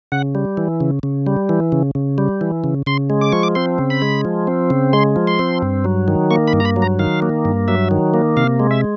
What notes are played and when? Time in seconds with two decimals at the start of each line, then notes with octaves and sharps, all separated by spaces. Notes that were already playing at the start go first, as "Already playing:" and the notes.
0.12 C#3 F#5
0.35 G3
0.57 E3
0.80 C#3
1.03 C#3
1.27 G3
1.49 E3
1.72 C#3
1.95 C#3
2.18 G3
2.41 E3
2.64 C#3
2.86 C#3 C6
3.10 G#3
3.21 D6
3.32 F3 C#6
3.43 D6
3.55 C4 C6
3.78 C#3
3.90 B5
4.02 G#3
4.25 F3
4.47 C4
4.70 C#3
4.93 G#3 C6
5.16 F3
5.27 C6
5.39 C4
5.62 G2
5.84 F#3
6.08 D#3
6.31 A#3 C#6
6.48 B5
6.53 G2
6.60 A#5
6.65 B5
6.76 F#3
6.82 A#5
6.99 D#3 F5
7.22 A#3
7.45 G2
7.68 F#3 E5
7.91 D#3
8.14 A#3
8.37 C3 F5
8.59 G#3
8.71 E5